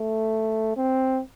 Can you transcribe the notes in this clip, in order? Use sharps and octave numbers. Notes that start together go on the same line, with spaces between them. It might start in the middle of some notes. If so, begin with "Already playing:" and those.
Already playing: A3
C4